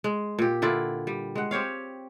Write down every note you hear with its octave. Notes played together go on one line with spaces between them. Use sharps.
G#3
A#2 G4
D3 E4 F4 D5
G3
G#3 F#5
C4 G4 C#5 F5